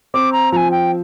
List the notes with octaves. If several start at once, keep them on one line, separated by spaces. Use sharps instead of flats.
C4 D6
A#5
F3 G#5 A#5
G5